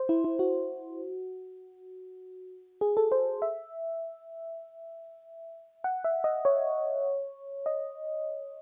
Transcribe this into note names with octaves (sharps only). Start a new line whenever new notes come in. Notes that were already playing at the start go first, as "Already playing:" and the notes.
Already playing: C5
E4
E4
F#4
G#4
A4
C5
E5
F#5
E5
D#5
C#5
D#5